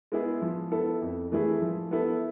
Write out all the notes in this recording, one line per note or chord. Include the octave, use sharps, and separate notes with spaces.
G#3 B3 E4 G#4
F3
B3 E4 A4
F2
E3 A3 E4 G#4
F3
B3 E4 A4